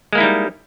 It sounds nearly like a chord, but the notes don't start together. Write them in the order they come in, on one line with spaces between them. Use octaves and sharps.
G#3 A#3 E4 D#4 G3